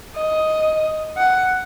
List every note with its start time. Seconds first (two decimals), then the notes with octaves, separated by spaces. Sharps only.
0.15 D#5
1.18 F#5